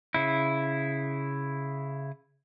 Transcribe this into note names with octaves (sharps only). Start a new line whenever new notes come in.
C#3 E4